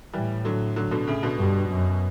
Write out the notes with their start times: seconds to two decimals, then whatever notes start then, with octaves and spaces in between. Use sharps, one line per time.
0.13 A2 E3 G3
0.45 D3 F#3
0.76 D3 F#3
0.91 B2 D3
1.07 A2 C#3
1.23 B2 D3
1.38 G2
1.70 F#2